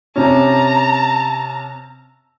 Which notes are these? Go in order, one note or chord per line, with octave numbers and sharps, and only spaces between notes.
C3 C#4 A5 A#5